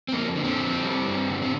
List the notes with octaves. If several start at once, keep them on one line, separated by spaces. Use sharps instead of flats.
C4
F2 A#3
D3
C4
F2
G3
G2
D3
C4